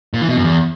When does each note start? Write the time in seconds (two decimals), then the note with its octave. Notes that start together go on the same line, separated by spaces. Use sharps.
0.14 A#2
0.21 E3
0.29 B2
0.36 F#2
0.44 E2